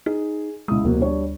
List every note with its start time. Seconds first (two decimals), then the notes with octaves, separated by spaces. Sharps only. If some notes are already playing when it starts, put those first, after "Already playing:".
0.06 D#4 G#4
0.68 C#2 G#3 E4 D#6
0.85 F1 D2 A#3 F#4
0.99 G3 D4 C#5